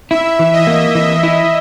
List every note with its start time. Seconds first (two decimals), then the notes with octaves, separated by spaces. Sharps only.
0.11 E4 E5
0.39 E3
0.53 D#5
0.67 A#3
0.95 E3 E5
1.23 E4